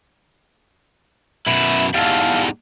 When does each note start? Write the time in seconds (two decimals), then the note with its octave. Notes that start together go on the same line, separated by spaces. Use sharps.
1.47 F#2 B2 E4
1.94 E2 G#2 G3 A4 F5